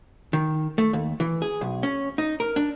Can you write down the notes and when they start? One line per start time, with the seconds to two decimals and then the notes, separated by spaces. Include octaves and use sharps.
0.33 D#3
0.78 A3
0.93 D#2
1.20 E3
1.42 G#4
1.61 B1
1.83 C#4
2.18 D#4
2.40 A#4
2.56 D4